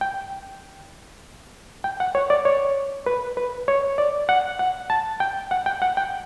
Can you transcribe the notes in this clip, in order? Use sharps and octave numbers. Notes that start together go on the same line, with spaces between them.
G5
G5
F#5
C#5
D5
C#5
B4
B4
C#5
D5
F#5
F#5
A5
G5
F#5
G5
F#5
G5